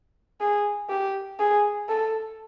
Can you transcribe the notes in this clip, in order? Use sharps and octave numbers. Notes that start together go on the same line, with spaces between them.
G#4
G4
G#4
A4